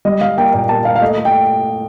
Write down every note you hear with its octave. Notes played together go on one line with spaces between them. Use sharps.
G3 D#5
G3 F5
A#3 G5
A#2 G5
A#3 A5
A#3 F5
F5
A3 D#5
A3
G5